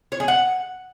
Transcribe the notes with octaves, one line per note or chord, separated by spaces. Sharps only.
C#5
G#4
F#5